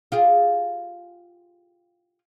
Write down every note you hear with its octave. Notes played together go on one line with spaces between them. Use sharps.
F4 G4 G#4